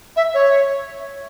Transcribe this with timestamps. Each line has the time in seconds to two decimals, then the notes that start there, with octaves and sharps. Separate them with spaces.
0.16 E5
0.34 C#5